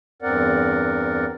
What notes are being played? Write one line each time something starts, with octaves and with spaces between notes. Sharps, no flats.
E2 G2 C4 A#4 D5 F#5